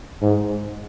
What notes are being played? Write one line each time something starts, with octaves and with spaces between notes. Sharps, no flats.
G#2